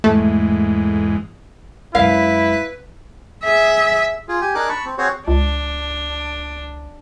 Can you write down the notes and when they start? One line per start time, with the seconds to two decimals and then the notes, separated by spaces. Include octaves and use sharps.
0.04 E2 G#2 A3
1.95 F#2 G#3 E4 B4 F5
3.44 G#4 E5
4.28 F4 G#4
4.41 G4 G#5
4.55 D4 D#4 G#4 A#4 D6 F#6
4.69 A5 B5 C#6
4.85 C4
4.98 C4 F#4 G#4 C5 C#5
5.28 C#2 D4